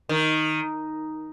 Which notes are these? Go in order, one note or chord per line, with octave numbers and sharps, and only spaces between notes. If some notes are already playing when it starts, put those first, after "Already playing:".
D#3